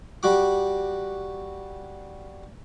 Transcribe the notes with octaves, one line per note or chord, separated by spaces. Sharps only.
G3 F#4 D6